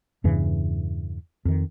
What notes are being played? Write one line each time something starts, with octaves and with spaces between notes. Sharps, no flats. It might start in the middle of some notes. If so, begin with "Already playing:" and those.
E2 G2 C#3 E3
F2 D#3